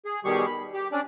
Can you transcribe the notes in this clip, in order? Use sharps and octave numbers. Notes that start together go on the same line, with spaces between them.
G#4
B2 D#3 G3 G4 G#4 C#6
B5
G4
C#4 D4 D5